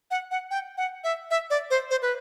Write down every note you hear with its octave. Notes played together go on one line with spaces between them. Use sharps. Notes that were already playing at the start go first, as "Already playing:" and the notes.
F#5
F#5
G5
F#5
E5
E5
D5
C5
C5
B4